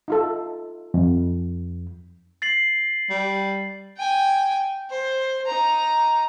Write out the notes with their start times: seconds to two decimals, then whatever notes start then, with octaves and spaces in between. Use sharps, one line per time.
0.08 D#4 F4 A4
0.94 F2
2.42 A6 C7 F#7
3.10 G3
3.97 G5 G#5
4.90 C5
5.46 D#4 A#5